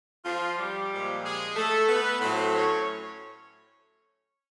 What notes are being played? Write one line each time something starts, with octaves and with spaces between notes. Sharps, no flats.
F3 F4
G3 G4
A#2 F3 G#3
G#3 G#4
A3 A4
B3 B4
A2 F#3 A3 C4 C5
C#4 C#5